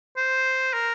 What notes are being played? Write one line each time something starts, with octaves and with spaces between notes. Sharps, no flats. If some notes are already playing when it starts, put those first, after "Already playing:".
C5
A#4